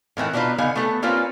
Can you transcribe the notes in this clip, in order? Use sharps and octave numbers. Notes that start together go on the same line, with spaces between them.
A2 D#3 E3 F#5
B2 D4 D#4 F4 B4
D3 B3 D#4 F5 G#5
A3 B3 A4
G3 A#3 C4 C#4 F4 B4